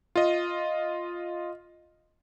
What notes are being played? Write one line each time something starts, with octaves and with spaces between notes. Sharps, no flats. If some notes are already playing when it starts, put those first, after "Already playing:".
F4 D#5